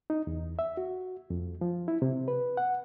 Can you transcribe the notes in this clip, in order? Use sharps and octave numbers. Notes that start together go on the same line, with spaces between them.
D#4
E2
E5
F#4
F2
F3
E4
C3
B4
F#5